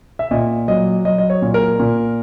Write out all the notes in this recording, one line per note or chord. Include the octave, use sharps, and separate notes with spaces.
E5
A#2 D#5
F#3 D#5
F#3 D#5
D#5
C#5
A#2
A#4
A#2